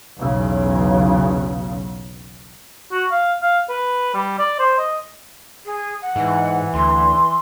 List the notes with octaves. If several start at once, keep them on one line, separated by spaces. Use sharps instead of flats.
B1 E2 C#3 F#3
F#4
F5
F5
B4
G3
D5
C5
D#5
G#4
F#5
G#2 E3
D2 C6